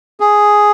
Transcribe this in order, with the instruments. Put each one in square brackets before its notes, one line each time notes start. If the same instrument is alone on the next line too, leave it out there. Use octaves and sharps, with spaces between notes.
[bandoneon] G#4